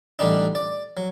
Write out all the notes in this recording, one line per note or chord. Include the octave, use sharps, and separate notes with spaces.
A1 D3 G3 D4 D#4
D5
F#3